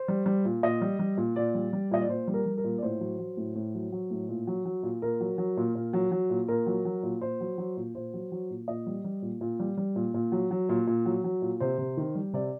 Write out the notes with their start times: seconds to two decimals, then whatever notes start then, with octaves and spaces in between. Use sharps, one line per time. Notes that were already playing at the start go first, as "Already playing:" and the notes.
Already playing: C5
0.08 G3
0.26 G3
0.45 A#2
0.63 A#2 D#5
0.82 G3
0.99 G3
1.17 A#2
1.36 A#2 D5
1.54 G3
1.73 G3
1.91 A#2 D#5
2.01 D5
2.09 A#2 C5
2.28 G3
2.34 A#4
2.46 G3
2.58 A#4
2.64 A#2
2.78 D5
2.82 A2 C5
3.00 F#3
3.19 F#3
3.37 A2
3.55 A2
3.74 F#3
3.92 F#3
4.10 A2
4.29 A#2
4.47 F#3
4.65 F#3
4.83 A#2
5.02 A#2 A#4
5.20 F#3
5.38 F#3
5.57 A#2
5.75 A#2
5.93 F#3
6.12 F#3
6.30 A#2
6.48 A#2 A#4
6.66 F#3
6.85 F#3
7.03 A#2
7.21 A#2 C5
7.40 F#3
7.58 F#3
7.77 A#2
7.95 A#2 C5
8.14 F#3
8.32 F#3
8.50 A#2
8.68 A#2 D#5
8.87 G3
9.04 G3
9.22 A#2
9.41 A#2
9.60 G3
9.77 G3
9.96 A#2
10.14 A#2
10.32 F#3
10.51 F#3
10.69 A#2
10.87 A#2
11.06 F#3
11.24 F#3
11.42 A#2
11.60 C3 C5
11.78 C3
11.97 D#3
12.15 G3
12.33 C3 D5